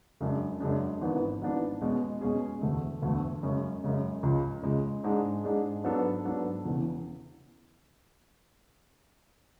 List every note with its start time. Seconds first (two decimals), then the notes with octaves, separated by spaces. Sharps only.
0.20 F#2 C#3 G#3 D4
0.60 F#2 C#3 G#3 D4
1.01 G#1 G#2 E3 B3 D4
1.42 G#1 G#2 E3 B3 D4
1.81 B2 G#3 C#4 G#4
2.21 B2 G#3 C#4 G#4
2.61 E1 D2 D3 A3
3.02 E1 D2 D3 A3
3.43 F#2 C#3 G#3 C#4
3.83 F#2 C#3 G#3 C#4
4.23 C#2 C#3 G#3
4.63 C#2 C#3 G#3
5.04 G#2 G#3 D4 G#4
5.44 G#2 G#3 D4 G#4
5.84 G#2 F#3 B3 D4 A4
6.25 G#2 F#3 B3 D4 A4
6.65 E1 E2 C#3 E3